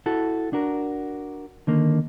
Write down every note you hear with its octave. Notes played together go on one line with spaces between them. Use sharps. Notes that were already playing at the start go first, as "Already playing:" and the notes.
E4 F#4 A4
D4 F#4 A#4
D3 D#3 A#3